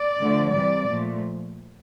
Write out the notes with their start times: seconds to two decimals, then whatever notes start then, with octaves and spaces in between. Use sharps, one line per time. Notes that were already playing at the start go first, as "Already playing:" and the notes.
Already playing: D5
0.20 D3 F3 A3
0.54 C3 E3 G3 D5
0.89 A#2 F3 A3